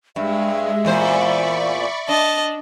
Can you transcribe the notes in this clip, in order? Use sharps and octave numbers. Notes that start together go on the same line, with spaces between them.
G2 G#3 E5
E2 A#2 C5 D5 B5 C#6
D4 D#5 A5